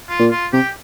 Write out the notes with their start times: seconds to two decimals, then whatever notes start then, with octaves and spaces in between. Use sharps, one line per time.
0.08 F4
0.20 A#2
0.31 F4
0.53 C3 G4